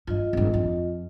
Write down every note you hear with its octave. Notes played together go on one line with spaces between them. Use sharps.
G2 F4 D#5
G#1 G2
F2